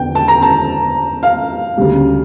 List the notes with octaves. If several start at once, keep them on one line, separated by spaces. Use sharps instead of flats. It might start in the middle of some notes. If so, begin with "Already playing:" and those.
Already playing: E2 D3 G5
A5
A#5
A5
F5
D2 C#3 G3